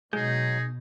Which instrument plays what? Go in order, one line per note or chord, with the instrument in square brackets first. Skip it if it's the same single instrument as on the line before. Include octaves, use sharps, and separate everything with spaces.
[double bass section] B2 [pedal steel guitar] F#3 D#5 G6 [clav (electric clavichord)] G#3 [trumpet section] D#4 G#4